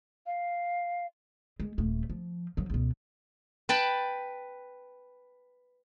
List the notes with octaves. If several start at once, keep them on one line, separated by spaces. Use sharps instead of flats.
F5
G#3
D#1 A3
F3
F3 F#3
C#2 B2
B4 G5 A5 B5